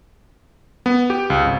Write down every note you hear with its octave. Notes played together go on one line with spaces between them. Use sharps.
B3
G4
C#2
G#1